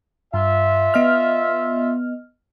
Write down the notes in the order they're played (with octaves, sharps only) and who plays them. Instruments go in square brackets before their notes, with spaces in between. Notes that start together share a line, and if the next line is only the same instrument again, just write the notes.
[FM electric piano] G2 [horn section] F4 E5
[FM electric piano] B3 D#5 F6